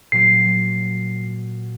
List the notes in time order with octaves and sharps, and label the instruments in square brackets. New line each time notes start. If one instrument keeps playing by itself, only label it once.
[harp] A#2 F#3 [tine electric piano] C7